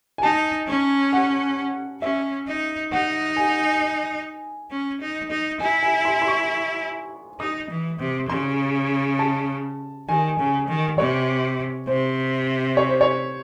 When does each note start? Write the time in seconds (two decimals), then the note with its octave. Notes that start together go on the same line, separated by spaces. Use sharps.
0.18 G#5
0.22 D#4 A5
0.67 C#4
1.13 F#5
2.02 C#4 E5
2.47 D#4
2.92 D#4 F#5
3.36 G#5
4.71 C#4
5.01 D#4
5.31 D#4
5.60 E4 G#5
5.83 G#5
6.05 C6
6.22 C6
6.28 C#6
7.40 D#4 D#6
7.70 E3
7.99 C3
8.29 C#3 C6
9.19 A5
10.09 D#3 G#5
10.39 C#3
10.68 D#3
10.98 C3 C#5
11.87 C3 C5
12.77 C#5
12.89 C5
13.01 C#5